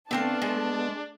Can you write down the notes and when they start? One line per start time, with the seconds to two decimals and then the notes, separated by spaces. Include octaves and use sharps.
0.11 D3 A3 B3 C4 D4 F5 A5
0.42 G#3